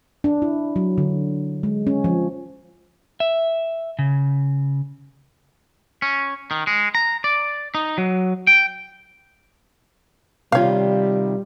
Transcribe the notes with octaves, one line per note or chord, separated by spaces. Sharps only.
D4
E4
F#3
D3
G#3
C#4
F3
E5
C#3
C#4
D#3
G#3
A#5
D5
D#4
F#3
G5
C3 D#3 G3 F4 C#5 F5